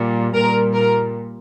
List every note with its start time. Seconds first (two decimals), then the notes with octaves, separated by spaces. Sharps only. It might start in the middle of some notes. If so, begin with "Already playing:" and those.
Already playing: A#2 G3
0.35 A#2 G3 A#4
0.73 A#4